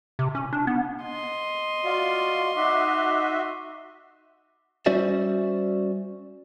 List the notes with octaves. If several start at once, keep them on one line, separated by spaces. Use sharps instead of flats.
C3
C#4
D4
B3
D#5 C6
F4 F#4 D5 F5
D#4 F#4 E5 D6
G3 C#4 F#4 C5 D5 E5